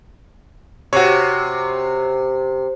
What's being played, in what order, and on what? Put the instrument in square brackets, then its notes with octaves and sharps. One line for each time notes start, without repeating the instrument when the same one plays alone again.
[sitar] C3 [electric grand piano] F#4 C#5